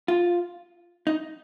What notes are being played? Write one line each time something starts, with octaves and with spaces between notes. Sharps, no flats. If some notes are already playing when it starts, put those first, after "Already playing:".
F4
D#4